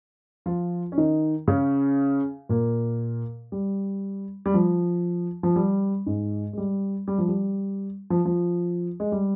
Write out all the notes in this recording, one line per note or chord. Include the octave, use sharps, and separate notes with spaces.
F3 F4
C#4
D#3 D#4
C#3 C#4
A#2 A#3
G3
G3
F3
F3
G3
G#2 G#3
G#3
G3
G3
F3
G3
F3
F3
G#3
G3